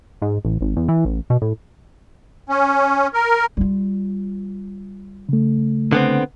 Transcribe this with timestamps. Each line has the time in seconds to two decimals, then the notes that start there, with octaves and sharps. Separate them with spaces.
0.22 G#2
0.45 A1
0.61 G#1
0.77 E2
0.88 E3
1.05 A1
1.30 B2
1.42 A2
2.49 C#4
3.14 A#4
3.57 G3 F4
5.29 C#3 A3
5.92 D3 B3 C4